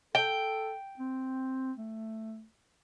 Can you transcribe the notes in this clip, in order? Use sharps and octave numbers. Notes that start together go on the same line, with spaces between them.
A4 G5
C4
A3